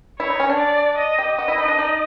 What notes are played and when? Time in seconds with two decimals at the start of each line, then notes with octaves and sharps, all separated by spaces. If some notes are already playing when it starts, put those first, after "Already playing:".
0.20 E4 C#5
0.30 D#4
0.40 C#4
0.49 D4
0.59 D5
0.98 D#5
1.19 G4
1.38 F#4 D#5
1.48 E4
1.58 D#4
1.68 D4
1.78 D#4